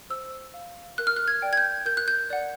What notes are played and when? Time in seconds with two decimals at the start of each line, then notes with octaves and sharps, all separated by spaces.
0.10 C5 E6
0.54 F5
0.98 A#4 F#6
1.07 F6
1.16 F#6
1.28 G#6
1.42 D5 G5
1.53 G#6
1.57 G6
1.86 A#4 G6
1.97 F#6
2.08 G6
2.30 D5 F#5